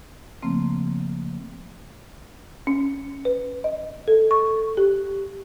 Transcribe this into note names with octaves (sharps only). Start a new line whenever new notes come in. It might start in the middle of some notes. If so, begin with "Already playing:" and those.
C#3 F3 A3 A#3 C4
C#4
B4
D#5
A4
C#6
G4